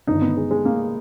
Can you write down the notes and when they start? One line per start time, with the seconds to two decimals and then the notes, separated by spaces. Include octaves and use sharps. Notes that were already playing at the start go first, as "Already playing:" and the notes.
0.07 G1 G2 D#3 D#4
0.22 B3
0.37 G#3
0.51 G#3
0.65 A#3